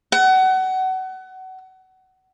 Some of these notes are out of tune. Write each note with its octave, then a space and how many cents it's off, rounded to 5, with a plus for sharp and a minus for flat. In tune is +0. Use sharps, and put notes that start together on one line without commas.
F#5 +25